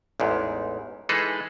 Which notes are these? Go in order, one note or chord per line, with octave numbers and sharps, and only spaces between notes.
A1 E2 G#2
E3 G#3 D#4 G#4 A4 B4